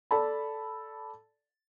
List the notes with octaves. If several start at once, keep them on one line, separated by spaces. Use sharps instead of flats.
A4 D5 A5 B5